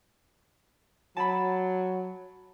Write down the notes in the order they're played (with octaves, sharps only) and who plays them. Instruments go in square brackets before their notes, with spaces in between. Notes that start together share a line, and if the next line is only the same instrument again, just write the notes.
[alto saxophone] F#3 [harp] A5 B5